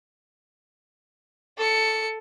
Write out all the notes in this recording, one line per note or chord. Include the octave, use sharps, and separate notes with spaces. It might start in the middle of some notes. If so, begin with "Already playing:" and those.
A4 C#7